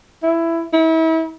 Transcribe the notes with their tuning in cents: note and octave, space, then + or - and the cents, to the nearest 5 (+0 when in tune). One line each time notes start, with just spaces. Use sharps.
E4 +10
E4 -35